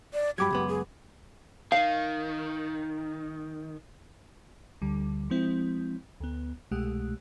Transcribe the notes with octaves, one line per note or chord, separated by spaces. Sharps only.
D5
G2 F#3 G4 B5 D6 G#6
C#2 F#2 B3
G#4
D#3 F5
D2 D3 G3
F3 G#3 C4 E4
D2 B3
C2 B2 G#3 A3 G4 F#6